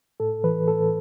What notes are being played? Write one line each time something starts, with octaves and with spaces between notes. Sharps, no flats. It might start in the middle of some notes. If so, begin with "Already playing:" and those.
A2 A4
E3 B4
A2 A4